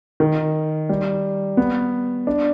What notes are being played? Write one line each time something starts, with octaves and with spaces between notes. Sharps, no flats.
D#3
G3
B3
D4